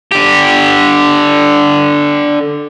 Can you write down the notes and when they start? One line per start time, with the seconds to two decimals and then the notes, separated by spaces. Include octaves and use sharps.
0.12 D3 G4